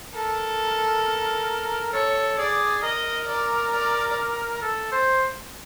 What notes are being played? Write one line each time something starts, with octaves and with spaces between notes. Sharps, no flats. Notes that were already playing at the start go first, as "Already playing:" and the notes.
A4 A#4
A4 C#5
G#4 D5
A#4 D#5
D5
D5
A4
C5